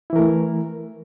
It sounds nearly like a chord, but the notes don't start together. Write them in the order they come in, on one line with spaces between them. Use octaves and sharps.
E4 E3 A#4 A3